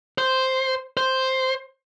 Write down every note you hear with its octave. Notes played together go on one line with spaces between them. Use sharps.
C5
C5